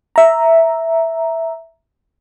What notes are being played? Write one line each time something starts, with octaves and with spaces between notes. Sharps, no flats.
E5 A#5